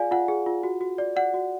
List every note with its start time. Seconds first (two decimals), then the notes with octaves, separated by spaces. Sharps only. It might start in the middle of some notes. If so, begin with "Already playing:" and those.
Already playing: F4 G#4 D5 F5 G#5
0.11 F4 F#5
0.28 G#4
0.46 F4
0.63 F#4
0.81 F#4
0.98 D5
1.16 D5 F#5
1.34 F#4